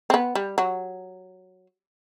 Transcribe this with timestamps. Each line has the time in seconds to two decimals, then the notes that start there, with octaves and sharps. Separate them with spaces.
0.10 C4
0.14 B3
0.35 G3
0.58 F#3